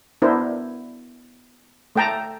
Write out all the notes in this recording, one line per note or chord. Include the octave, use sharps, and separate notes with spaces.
B3 D4 E4 A#4 C5
A3 A4 G5 A5 A#5